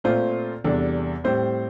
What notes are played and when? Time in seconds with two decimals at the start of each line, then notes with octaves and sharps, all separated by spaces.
0.04 A#2 A3 C4 F4 C5
0.64 E2 C3 G3 D4 A4
1.24 A2 G3 C4 G4 C5